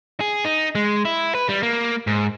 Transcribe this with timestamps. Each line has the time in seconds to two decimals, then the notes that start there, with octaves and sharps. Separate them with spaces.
0.20 G#4
0.45 D#4
0.75 G#3
1.05 E4
1.35 B4
1.49 G3
1.63 A#3
2.07 G#2